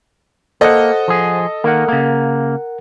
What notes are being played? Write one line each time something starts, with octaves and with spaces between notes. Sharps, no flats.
A#3 A4 C5 D#5 F#5
F3 G#4
D#3 A#3 A#4 F#5
C#3 A#3